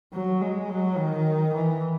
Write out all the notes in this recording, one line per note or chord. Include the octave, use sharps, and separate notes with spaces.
F#3
G#3
F#3
D#3
E3